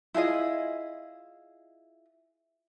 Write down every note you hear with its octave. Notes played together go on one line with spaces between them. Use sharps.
E4 F4 G#4 D#5